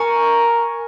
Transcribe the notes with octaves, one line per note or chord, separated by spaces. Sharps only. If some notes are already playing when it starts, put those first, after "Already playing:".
Already playing: A#4 G#5 C#6